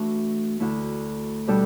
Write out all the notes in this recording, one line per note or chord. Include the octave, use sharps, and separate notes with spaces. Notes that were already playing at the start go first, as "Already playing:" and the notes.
Already playing: E3 A3 D4 F#4
D2 D3 A3 E4
B2 G3 D4 A4